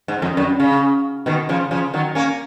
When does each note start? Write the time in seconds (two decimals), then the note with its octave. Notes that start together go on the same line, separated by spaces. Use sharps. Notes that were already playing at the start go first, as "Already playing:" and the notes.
0.08 G#2
0.22 F2
0.37 F#2
0.60 C#3
1.26 B2 D#3
1.49 C#3 F3
1.71 C#3 F3
1.94 D#3 F#3
2.15 A#3 C#4